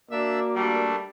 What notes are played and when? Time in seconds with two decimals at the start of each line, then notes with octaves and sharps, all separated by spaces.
0.11 A#3 D4 F#4 D5 E5 E6
0.56 G3 A3 D4